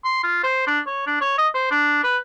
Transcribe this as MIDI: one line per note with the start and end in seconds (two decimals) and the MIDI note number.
0.04 0.24 84
0.24 0.42 65
0.44 0.63 72
0.67 0.79 62
0.87 1.03 73
1.07 1.17 62
1.21 1.36 73
1.38 1.49 75
1.54 1.66 72
1.71 2.01 62
2.04 2.17 71